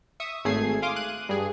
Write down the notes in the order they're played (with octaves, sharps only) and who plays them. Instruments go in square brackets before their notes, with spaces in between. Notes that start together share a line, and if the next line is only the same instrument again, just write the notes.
[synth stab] E5 C#6 D#6
G#1 A3 G#4 G#6 C7
F5 C6 D6 D#6
F#6 D#7
G2 G#4